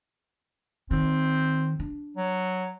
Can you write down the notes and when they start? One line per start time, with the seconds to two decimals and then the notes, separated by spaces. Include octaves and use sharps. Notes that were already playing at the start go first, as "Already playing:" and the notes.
0.91 D#3 C4
1.80 D4
2.17 F#3